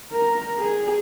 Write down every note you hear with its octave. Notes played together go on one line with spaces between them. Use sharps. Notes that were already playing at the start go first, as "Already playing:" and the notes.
A#4
G#4